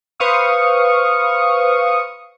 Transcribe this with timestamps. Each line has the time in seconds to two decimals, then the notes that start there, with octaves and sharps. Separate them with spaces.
0.20 B4 C5 F5 C#6 D#6